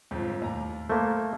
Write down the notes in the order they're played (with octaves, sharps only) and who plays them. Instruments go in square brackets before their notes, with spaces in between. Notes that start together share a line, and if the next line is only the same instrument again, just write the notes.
[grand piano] G1 F2 G#2
D#2 A2 A#5
[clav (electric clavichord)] A3 A#3 [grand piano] C5